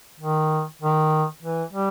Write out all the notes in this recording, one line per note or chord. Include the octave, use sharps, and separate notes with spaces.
D#3
D#3
E3
G3